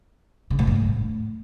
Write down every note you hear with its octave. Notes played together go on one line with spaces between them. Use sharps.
C#3
A2
G2
A2